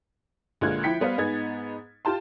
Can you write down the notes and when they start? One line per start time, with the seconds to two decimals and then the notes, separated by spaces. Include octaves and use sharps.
0.61 A#1 D3 G#3 F4 F#6 G#6
0.83 F3 E4 G5 B6 C#7
1.00 G3 B3 B4 C5 F5
1.18 G#2 B3 D#4 G#4 G#6 A6
2.05 F4 G4 A5 C6